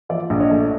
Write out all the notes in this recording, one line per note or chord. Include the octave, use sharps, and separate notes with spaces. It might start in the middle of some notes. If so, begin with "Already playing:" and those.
F3 D5 E5
A#1
C#5 D#5
A3